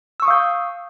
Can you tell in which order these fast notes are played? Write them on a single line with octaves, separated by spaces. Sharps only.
E6 C#6 D#6 F5 G6